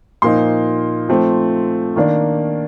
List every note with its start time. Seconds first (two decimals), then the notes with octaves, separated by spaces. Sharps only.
0.22 A#2 F3 A#3 D#4 C6
1.09 F3 A3 C4
1.96 D#3 A#3 D4